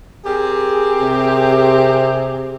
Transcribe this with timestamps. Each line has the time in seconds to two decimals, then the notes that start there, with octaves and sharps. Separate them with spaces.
0.25 C4 G4 G#4 A#4
1.02 C3